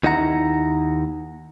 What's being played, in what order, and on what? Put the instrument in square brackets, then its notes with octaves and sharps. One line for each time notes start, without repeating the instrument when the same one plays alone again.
[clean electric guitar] D#2 D#4 E4 F#5 A#5